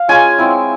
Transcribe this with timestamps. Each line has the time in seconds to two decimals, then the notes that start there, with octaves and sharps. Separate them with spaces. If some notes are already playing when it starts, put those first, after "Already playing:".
Already playing: F5
0.08 G#3 C#4 F4 G#5
0.38 G#3 C4 E4